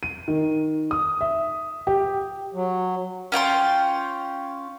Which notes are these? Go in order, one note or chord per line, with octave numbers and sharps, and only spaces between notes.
D#7
D#3
D#6
E5
G4
F#3
C#4 F4 G5 C6